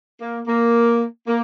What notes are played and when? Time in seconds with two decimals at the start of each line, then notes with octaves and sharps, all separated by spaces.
0.21 A#3
0.47 A#3
1.27 A#3